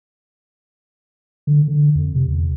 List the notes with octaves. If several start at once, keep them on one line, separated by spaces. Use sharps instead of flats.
D3
D3
F2
C3
E2